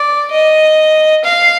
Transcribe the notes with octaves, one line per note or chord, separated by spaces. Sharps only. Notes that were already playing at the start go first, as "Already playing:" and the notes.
Already playing: D5
D#5
F5